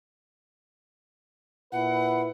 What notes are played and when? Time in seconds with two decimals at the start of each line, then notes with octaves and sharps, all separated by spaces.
1.72 A#2 E4 B4 F#5